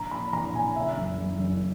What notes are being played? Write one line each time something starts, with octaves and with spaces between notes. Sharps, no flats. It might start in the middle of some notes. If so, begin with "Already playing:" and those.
Already playing: A#1 A#5
A#2 B5
A#1 A#5
A#2 G#5
C#3 E5
F#1
F#1
F#1